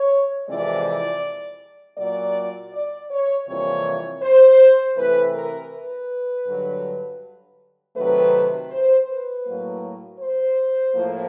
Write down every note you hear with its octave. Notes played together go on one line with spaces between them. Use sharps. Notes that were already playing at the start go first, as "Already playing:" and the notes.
Already playing: C#5
F2 C3 E3 G#3 D5
A#2 F#3 A#3 D5
D5
C#5
F2 C3 E3 G3 A#3 C#5
C5
C3 E3 A3 B4
A#4
B4
G2 D3 F#3
C3 D#3 F#3 A3 B4
C5
B4
A2 F#3 A#3
C5
A2 F3 A#3